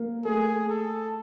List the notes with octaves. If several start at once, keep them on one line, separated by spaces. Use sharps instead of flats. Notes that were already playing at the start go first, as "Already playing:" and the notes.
Already playing: A#3
A3 G#4
A4